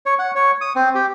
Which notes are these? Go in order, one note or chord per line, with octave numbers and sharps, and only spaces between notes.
C#5
F#5
C#5
D#6
C4
G4